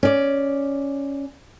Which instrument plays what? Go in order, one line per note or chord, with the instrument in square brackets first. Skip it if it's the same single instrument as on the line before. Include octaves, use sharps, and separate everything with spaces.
[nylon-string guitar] C#4 D5